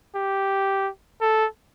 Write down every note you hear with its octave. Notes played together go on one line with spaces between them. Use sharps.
G4
A4